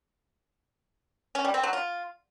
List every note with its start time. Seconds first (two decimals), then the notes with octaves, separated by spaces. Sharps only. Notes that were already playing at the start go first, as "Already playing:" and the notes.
1.35 C#4
1.44 G3
1.54 C4
1.63 F#3
1.73 F4